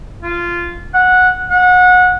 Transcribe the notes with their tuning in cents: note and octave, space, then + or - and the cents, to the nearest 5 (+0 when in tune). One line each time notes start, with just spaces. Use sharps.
F4 -10
F#5 -10
F#5 -25